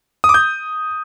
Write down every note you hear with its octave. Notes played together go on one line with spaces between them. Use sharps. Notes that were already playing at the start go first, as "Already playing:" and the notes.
D#6
D6
G6